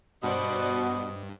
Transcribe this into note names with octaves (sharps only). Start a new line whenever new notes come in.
G2 B2 C5 D5 D#5 F#5